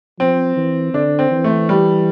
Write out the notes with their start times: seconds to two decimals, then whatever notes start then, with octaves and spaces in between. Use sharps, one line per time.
0.19 F3 C4
0.57 E3
0.94 D3 D4
1.19 C4
1.31 E3
1.44 A3
1.69 G3